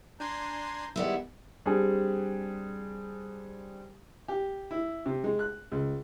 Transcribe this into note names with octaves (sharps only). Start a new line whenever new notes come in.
D4 G#5 A#5 C6 G6
D#3 G3 G#3 B3 E4
G3 C4 D4 G4 G#4
G4
E4
C3
G#3
F#6
C#2